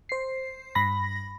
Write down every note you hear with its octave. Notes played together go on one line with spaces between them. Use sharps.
C5 C7
G2 B5 A#6